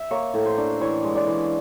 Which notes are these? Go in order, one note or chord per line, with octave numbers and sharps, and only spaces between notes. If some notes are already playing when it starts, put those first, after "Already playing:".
Already playing: E5
A#3 C#5
A2
C5
D4
E3 C#5
G#3
D5
E3